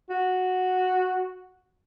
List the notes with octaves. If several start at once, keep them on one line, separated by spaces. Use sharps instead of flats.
F#4